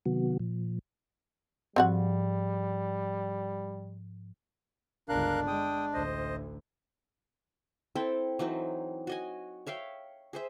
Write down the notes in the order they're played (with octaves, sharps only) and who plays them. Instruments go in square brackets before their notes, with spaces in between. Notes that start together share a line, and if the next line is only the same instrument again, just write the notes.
[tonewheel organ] C3 D#3 F#3 B3 F#4
A#2 F3
[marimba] G#2 F3 [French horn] G3 [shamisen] C4 F#4 F#5
[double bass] G1 C#2 [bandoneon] D4 [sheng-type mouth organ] A#4 F5 F#6
[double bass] G#3 [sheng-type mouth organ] G5 D#6
[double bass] A1 D2 [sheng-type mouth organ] C5 D#5
[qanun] C4 E4 A4 G5
E3 F#3 C4 D#4
F#4 D#5 G#5
C#5 E5 F5 G5
G#4 C5 E5